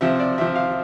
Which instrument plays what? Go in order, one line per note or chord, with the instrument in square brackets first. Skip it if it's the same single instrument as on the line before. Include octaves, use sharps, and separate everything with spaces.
[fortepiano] C3 F3 E5
D5
C3 F3 E5
F5